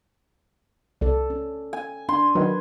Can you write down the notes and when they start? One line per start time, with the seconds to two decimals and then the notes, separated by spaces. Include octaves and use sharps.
1.01 C2 A4 D5
1.30 C#4
1.73 G#5
2.09 D4 C6
2.35 D#3 F#3 B4